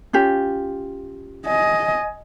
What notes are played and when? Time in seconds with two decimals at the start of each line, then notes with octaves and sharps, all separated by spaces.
0.13 C#4 F4 G4
1.46 D#5 G#5